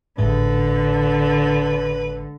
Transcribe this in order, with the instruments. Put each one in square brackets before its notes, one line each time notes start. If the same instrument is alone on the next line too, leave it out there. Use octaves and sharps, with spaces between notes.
[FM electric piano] G#1 A2 G#3 [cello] D3 [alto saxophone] B4